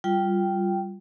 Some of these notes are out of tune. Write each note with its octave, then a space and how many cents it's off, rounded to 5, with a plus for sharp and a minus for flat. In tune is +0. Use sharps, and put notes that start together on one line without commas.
G3 -10 F4 +0 G5 -10